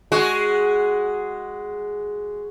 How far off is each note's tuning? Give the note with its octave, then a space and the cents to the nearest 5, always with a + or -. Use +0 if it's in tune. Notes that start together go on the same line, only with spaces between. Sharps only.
G#3 +0 F#4 +0